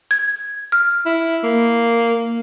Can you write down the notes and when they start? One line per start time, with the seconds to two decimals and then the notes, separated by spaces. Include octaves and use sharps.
0.11 G#6
0.72 F6
1.06 E4
1.44 A#3